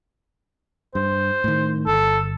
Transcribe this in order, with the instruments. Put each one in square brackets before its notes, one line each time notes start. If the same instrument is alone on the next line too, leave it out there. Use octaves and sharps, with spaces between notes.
[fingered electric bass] G2 [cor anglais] C5
[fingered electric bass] A2 D#3
[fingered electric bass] G1 [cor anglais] A4